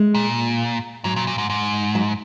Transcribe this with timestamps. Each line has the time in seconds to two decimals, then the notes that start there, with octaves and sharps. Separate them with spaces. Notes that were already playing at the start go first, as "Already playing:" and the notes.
Already playing: G#3
0.15 A#2
1.04 G#2 F#3
1.16 A#2
1.27 A#2
1.38 G#2
1.50 G#2
1.95 F#3